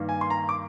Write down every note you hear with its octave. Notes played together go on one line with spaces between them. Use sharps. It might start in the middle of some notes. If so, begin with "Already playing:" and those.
Already playing: G2 D#3 A#3
G#5
C6
A#5
D6